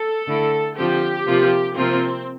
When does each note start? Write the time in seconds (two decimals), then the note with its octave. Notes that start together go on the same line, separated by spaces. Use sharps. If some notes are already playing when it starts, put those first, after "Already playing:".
Already playing: A4
0.27 D3 A3 E4
0.77 D3 F3 C4 G4
1.27 C3 F3 A#3 F4
1.77 C3 F3 A#3 C4 F4